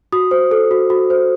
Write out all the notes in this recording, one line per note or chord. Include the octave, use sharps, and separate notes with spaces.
F#4 D#6
C5
A4
F#4
F#4
C5